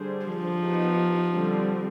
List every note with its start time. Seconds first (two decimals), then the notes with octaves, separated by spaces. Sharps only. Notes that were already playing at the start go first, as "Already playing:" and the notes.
Already playing: D3 G3 D4 G#4 C5
0.26 F3
0.61 B3 D#4 G4
1.32 D3 G3 C4